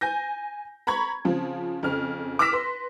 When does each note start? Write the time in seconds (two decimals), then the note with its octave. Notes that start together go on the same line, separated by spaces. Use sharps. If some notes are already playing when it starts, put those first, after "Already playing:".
0.01 G#5 G6 A#6
0.87 A#5 B5 C#6 G#6
1.25 C#3 F3 C4 F4
1.83 F2 C#3 F6
2.39 D6 E6 F6 A#6 B6 E7
2.53 B4 C6